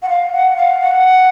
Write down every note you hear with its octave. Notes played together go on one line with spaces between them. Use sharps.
F#5
F5
F#5
F5
F#5